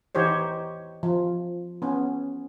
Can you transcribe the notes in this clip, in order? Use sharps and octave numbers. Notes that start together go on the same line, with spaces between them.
E3 D#4 G4 C5 C#5
F3
B3 C#4